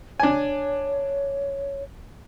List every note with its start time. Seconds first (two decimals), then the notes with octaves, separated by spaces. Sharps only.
0.20 D4 C#5 G#5